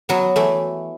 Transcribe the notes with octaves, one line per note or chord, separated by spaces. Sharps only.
F#3 B3
E3 A3